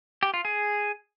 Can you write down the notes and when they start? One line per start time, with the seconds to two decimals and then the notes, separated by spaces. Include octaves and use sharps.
0.23 G4
0.34 F4
0.45 G#4